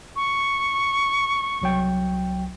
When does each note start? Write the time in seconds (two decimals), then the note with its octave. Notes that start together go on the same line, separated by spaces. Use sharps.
0.16 C#6
1.62 C2 F#3 G5